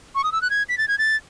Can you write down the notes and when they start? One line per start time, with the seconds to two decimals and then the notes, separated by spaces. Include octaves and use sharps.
0.15 C#6
0.24 D#6
0.32 E6
0.42 F#6
0.50 G#6
0.69 B6
0.78 A6
0.88 G#6
0.98 A6